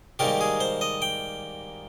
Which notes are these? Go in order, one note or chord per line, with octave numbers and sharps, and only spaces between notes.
G#2 D#3 G3 A#3 G4
G#4
C5
D#5
G5